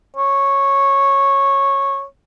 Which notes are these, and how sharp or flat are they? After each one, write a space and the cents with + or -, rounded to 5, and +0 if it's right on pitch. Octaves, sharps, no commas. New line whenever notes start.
C#5 -10